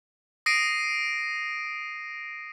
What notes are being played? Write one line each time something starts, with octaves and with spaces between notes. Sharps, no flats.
D#6 A#6 C7 D7 D#7